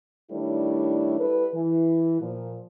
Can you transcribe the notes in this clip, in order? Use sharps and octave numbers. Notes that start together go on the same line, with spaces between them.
D#3 G3 A3 D4 E4 C#5
G3 E4 A4 B4
E3
A#2 F3